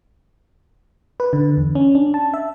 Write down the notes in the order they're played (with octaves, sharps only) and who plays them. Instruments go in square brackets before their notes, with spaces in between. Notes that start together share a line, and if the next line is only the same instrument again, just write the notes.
[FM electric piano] B4
D3
E2
C#4
D4
A5
E5